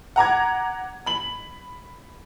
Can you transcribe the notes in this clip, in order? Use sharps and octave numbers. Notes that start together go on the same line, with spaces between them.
F#5 A#5 D6 G#6
B5 F#7